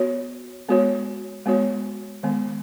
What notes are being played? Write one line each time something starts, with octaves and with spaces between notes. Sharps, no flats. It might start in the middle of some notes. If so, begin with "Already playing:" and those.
Already playing: B3 F#4 C#5
G#3 B3 F#4 C#5
G#3 B3 F#4 C#5
D#3 G#3 B3